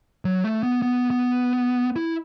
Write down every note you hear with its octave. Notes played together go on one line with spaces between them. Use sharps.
F#3
A3
B3
B3
B3
E4